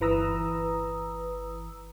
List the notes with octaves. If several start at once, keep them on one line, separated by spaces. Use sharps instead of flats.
G1 E3 B4 A#5 D#6 E6